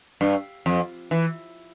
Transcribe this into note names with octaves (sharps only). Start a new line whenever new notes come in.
G2
F2
E3